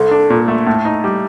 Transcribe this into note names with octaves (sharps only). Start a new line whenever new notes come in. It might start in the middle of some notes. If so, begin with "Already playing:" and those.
Already playing: C2 A4
D4
A#2
A3
A2
D#4
G3